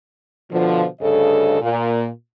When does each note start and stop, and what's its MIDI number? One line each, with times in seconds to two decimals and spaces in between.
0.51 0.84 47
0.51 0.84 50
0.51 0.84 53
1.01 1.59 38
1.01 1.59 43
1.01 1.59 49
1.01 1.59 69
1.01 1.59 75
1.61 2.06 46